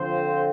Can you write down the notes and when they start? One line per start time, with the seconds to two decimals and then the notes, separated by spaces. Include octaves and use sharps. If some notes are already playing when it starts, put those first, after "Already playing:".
Already playing: D3 F3 C4 C5